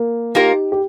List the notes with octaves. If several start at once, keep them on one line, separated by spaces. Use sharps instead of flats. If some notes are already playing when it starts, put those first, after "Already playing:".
Already playing: A#3
A#3 D#4 F4 G4 A#4
G4